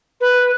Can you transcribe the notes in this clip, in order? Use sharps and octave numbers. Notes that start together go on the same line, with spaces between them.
B4